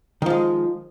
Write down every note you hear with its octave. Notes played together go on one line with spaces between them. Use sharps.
D#3 F3 G#3